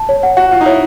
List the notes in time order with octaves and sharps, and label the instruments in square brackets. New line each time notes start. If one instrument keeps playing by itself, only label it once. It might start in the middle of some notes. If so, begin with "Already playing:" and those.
Already playing: [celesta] A5
C#5
F#5
[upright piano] F#4 [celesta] F#5
[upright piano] F4 [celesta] F#5
[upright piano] D#4
[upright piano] E4 [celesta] C#5